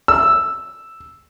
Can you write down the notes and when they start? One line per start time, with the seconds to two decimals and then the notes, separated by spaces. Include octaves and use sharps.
0.08 E6